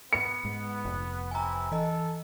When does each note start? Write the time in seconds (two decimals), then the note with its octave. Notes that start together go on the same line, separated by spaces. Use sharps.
0.13 B3 C#7
0.45 G#2
0.85 F1
1.31 C3 E3 E4 G#5 A#5
1.72 E3 A4 D#5